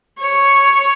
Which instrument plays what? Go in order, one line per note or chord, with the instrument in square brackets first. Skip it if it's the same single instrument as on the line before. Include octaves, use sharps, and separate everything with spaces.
[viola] C#5